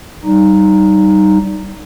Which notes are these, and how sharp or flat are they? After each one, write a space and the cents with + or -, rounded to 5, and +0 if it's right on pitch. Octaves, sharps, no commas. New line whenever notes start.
G3 -25 D#4 -10